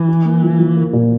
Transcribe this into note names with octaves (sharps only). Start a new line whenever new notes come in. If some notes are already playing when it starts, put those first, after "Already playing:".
Already playing: E3
E4
A#3
F3
F3
A#3
A#2